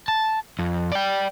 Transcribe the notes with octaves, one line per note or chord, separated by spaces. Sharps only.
A5
F2
D5 G5